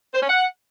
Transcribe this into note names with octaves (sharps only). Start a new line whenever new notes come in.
C5
C#4
F#5